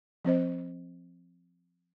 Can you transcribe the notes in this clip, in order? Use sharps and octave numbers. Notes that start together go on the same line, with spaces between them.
F3 C4 C5 D#5